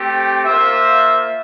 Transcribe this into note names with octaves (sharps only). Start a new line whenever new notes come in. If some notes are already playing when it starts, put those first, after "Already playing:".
Already playing: A3 C4 G4
A#3 F4 C5 E5